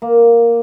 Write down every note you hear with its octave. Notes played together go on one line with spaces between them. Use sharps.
A#3